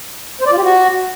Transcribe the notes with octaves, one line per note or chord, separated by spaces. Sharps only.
C5
D5
F4
G4
F#4